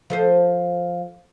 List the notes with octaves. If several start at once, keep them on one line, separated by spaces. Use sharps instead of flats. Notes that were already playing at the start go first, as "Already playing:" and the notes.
F3 A4 C5